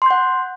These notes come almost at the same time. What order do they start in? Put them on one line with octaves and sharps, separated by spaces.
C6 G6 F#5